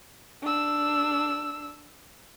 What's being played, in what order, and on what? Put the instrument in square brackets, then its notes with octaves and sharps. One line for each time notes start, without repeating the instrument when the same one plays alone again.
[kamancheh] D4 E6